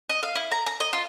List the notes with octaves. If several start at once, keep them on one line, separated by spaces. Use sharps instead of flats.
D#5
F5
E4
A#5
A#5
D#5
F4